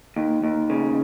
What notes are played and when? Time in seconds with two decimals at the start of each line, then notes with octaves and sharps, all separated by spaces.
0.16 D#2
0.43 D#2
0.70 C#3